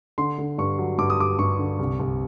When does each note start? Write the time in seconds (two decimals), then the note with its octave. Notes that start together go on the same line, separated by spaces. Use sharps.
0.18 D3 C6
0.38 D3
0.58 G2 C#6
0.78 F#3
0.98 G2 D6
1.10 D#6
1.19 G2 D6
1.39 G2 C#6
1.59 D3
1.79 C2
2.00 C2